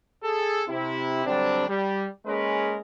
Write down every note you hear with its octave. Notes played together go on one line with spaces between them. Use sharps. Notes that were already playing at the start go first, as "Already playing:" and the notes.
G#4 A4
C3 E4
D3 F#3 G3 C4 D4
G3
G#3 A#3 C#4 G#4 A#4 B4